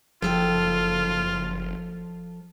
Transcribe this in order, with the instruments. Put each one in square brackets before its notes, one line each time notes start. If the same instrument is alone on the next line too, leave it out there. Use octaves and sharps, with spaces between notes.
[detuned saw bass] F#1 [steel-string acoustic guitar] F3 A4 G5 [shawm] F4